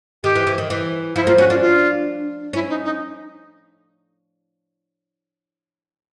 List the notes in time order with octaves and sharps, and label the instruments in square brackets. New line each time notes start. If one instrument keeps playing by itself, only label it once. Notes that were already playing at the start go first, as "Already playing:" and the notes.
[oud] D#3 [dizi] G4
[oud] E3
E3
D#3
E3
[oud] F3 [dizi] E4
[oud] A#3 [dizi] F4
[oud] C#4 [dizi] F#4
[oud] D4 [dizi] F4
[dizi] F4
[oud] C#4 [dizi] E4
[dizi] D#4
D#4